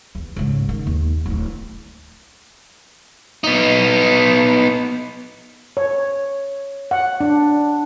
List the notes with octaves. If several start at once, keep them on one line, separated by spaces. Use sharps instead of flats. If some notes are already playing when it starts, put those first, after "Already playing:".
E2
C#2 G#2
D#3
D#2
D1 E4
B3 D#4
C#5
F#5
D4